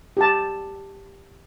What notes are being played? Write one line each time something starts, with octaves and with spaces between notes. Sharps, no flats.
G4 A5